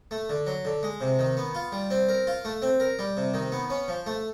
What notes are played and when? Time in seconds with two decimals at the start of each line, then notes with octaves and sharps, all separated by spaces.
0.11 A3
0.29 D3
0.47 F#3
0.65 D3
0.83 G#3
1.01 C3
1.19 D#3
1.37 B3
1.55 F4
1.72 G3
1.91 C4
2.09 A#4
2.27 F4
2.45 A3
2.62 C4
2.80 A#4
2.99 G3
3.17 C3
3.34 D#3
3.52 B3
3.70 C#4
3.88 F3
4.06 A3